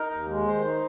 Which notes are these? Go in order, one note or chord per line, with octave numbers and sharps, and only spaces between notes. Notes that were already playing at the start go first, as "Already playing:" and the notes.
Already playing: D#4 A#4
D#2
G#3
D#3 C5
D#4